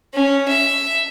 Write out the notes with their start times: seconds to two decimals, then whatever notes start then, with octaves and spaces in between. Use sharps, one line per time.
0.14 C#4
0.48 E5